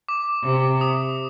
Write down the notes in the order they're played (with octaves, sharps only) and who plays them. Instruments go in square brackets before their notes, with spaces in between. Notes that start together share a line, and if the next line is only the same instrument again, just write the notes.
[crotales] D6
[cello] C3
[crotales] D#6